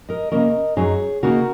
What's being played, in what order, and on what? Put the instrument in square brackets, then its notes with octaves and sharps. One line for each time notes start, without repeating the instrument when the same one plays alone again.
[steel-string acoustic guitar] A#4 D#5
C#3 A#3 C#4 A#4 D#5
F#2 F#3 D#4 G#4 C#5
C#3 A#3 D#4 F#4 A#4